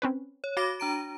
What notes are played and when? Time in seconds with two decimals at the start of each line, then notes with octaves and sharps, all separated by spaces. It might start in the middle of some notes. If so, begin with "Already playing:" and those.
0.02 C4 C#4 B4
0.44 C#5
0.57 F#4 F5 D6 A#6
0.80 D4 A#5 D7